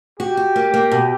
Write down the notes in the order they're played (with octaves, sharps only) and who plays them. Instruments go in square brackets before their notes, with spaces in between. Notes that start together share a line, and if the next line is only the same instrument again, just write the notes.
[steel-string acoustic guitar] F#4 [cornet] G4
[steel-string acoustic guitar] F#4
A#3
A#3
B2